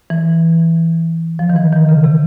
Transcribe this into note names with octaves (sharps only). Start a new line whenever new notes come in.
E3
F3
D#3
E3
D#3
C#3
C3